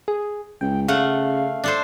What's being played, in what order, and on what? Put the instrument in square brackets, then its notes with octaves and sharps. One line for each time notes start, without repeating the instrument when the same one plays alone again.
[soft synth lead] G#4
[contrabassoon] C#2 [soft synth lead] G5
[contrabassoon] C#3 [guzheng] A3 F#5 [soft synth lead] F5
[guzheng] D4 A4 C5